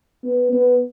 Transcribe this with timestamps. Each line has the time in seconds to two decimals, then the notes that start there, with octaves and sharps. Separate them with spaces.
0.24 B3
0.52 B3